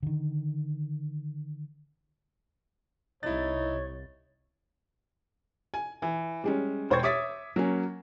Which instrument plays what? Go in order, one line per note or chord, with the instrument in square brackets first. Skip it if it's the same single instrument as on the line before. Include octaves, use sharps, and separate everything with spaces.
[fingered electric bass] D3 D#3
[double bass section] C2 [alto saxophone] D#4 [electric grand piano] E4 A6 [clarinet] C#5
[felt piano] G#5
E3
G3 G#3 C#4
E1 C5 G5 C#6 G#6
C#5 E5 D6 D#6 A6 B6
F#3 A#3 C#4